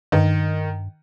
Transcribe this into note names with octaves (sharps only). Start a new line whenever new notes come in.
G2 D#3